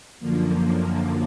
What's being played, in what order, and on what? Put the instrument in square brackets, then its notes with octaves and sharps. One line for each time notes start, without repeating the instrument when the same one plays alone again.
[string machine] F#2 D3 F3 A#3